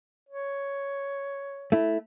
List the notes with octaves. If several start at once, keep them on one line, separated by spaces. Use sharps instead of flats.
C#5
A3 E4